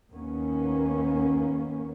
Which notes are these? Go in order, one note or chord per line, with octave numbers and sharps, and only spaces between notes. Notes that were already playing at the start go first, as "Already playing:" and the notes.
D#2 D#3 A#3 B3 C#4